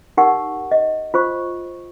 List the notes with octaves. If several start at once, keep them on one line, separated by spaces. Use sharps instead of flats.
D#4 G4 A#4 F#5 C#6
D#5
F4 C5 C#6